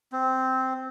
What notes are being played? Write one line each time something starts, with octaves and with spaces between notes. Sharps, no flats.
C4